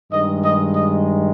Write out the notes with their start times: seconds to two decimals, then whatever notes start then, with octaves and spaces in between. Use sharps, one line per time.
0.11 G2 D#3 G#3 D#5
0.42 D#5
0.74 D#5